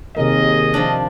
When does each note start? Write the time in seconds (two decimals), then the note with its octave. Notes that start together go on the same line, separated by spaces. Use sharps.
0.17 D#2 C3 D#3 G#4 A#4 D#5
0.74 F3 D4